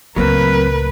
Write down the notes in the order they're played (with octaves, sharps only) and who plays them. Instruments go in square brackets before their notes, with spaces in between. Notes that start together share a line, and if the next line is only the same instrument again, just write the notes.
[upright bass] C#2 A2 [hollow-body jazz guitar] F#3 A#3 C4 [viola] A#4 B4